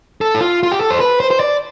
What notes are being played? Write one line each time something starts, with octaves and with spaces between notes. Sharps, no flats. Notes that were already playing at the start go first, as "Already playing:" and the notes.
A4
E4
F4
F4
G4
A4
C5
B4
C5
C5
D5